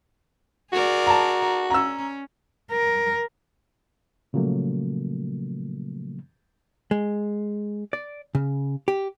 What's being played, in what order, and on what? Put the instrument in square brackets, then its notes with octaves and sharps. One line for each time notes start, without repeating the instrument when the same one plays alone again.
[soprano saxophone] F#4 [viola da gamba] G#4 A#4 D5
[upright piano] A5 A#5
[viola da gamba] C#4 [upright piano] A#5 E6
[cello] A#4
[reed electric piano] A#2 C#3 F3 F#3 A3 A#3
[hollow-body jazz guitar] G#3
D5
C#3
G4